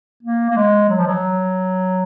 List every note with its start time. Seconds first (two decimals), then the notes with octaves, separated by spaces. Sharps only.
0.23 A#3
0.50 A#3
0.57 G#3
0.89 F#3
0.98 F3
1.07 F#3